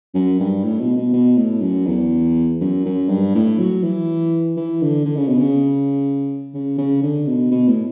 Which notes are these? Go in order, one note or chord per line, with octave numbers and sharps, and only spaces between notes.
F#2
G2
A2
B2
B2
B2
A2
F#2
E2
F#2
F#2
G2
A2
F#3
E3
E3
D3
D3
C#3
B2
C#3
C#3
C#3
D3
B2
B2
A2